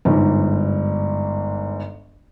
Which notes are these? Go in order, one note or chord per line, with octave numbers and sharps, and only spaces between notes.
G1 G#2